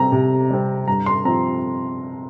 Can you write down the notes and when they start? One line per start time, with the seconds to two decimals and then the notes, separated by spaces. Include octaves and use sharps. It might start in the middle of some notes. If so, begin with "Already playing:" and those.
Already playing: C3 G3 C4 A#5
0.12 C3
0.50 G3 C4
0.88 G2 A#5
1.06 C6
1.25 F3 C4 A#5